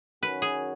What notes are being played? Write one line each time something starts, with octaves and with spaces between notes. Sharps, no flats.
F#2 D#3 F#3 C#4 F#4 B4
G#4